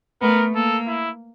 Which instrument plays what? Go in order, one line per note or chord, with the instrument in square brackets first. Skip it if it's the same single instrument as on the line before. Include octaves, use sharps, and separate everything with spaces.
[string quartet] A3 B3 [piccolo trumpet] A#4
[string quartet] A#3 [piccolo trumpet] A4
[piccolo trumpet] E4